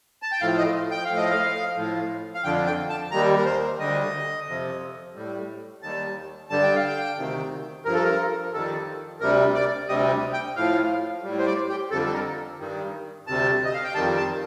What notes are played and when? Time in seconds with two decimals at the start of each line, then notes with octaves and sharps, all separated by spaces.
0.22 A5
0.32 G5
0.41 A2 F3 F5
0.58 D#5
0.91 G5
1.05 A2 F3 F5
1.17 D#5
1.30 F5
1.77 A2 F3
2.34 F5
2.44 F2 D3 F3 G5
2.66 G5
2.90 A5
3.11 D#2 D#3 G3 A#5
3.37 A#4
3.45 C5
3.79 D2 D3 G3 D#5
4.47 F2 C3 F3
5.15 A2 G3
5.82 D#2 D#3 G3 A5
6.50 G2 D3 G3 A5
6.63 G5
6.75 F5
6.88 G5
7.18 D2 C3 D#3
7.85 G2 F3 A#4
7.94 A4
8.04 A#4
8.53 F2 D#3 G3 A4
9.20 D2 C3 G3 A#4
9.55 D5
9.89 D2 C3 G3 D#5
10.33 G5
10.56 A2 F3 F5
11.24 A2 G3
11.39 C5
11.46 D5
11.69 G4
11.91 F2 D3 G3 A4
12.06 A4
12.13 A#4
12.59 G2 D#3 G3
13.27 D2 C3 G3 A5
13.65 D#5
13.74 F5
13.84 G5
13.95 F2 D#3 G3 A5
14.17 A5